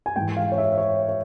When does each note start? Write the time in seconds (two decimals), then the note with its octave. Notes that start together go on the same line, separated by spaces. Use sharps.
0.06 G#5
0.16 G#2 E3 G5
0.37 F5
0.52 C#5
0.58 E5
0.72 E5
0.78 C#5
1.09 C#5